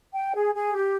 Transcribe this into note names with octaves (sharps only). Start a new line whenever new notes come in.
G5
G#4
G#4
G4